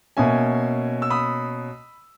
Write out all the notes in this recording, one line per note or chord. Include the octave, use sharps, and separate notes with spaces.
B2 A#3 C#4 E5 G#5
E6
B5 D#6